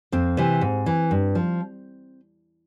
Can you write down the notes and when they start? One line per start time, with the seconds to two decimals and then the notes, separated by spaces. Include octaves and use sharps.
0.12 F2 C4
0.37 C3 E3
0.61 G#2
0.86 E3
1.11 G2
1.35 F3